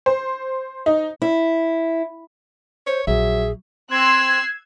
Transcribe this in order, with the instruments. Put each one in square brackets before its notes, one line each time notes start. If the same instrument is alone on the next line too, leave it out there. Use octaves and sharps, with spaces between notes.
[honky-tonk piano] C5
D#4
[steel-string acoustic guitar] E4
[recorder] C5 [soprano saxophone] C#5
[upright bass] A#1 [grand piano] F#3 [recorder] G#4 [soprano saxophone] E5
[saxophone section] C4 [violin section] E6 F#6 C7 [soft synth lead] G#6